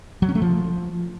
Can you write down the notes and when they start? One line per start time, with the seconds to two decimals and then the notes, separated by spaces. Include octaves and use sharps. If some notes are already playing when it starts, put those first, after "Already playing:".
0.22 F#3
0.29 C#4
0.35 A3
0.42 F3